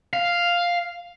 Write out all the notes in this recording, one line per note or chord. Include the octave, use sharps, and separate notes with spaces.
F5